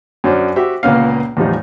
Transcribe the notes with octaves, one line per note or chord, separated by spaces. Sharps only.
F#2 C#4 D4 C5 C#5
F#4 G4 C5 E5
C#2 A#2 A#3 B3 C#4 F5
E2 A2 F3 G3 D#4